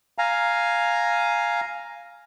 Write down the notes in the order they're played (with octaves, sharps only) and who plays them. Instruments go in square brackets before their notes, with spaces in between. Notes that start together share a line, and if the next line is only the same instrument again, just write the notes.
[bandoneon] F5 G#5 A#5